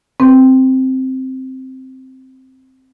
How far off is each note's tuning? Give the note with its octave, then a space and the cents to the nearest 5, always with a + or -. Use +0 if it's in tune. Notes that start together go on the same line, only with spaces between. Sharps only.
C4 +0 B4 +0